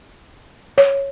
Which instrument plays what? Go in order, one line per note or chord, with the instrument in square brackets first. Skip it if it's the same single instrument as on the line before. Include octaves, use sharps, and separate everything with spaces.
[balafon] C#5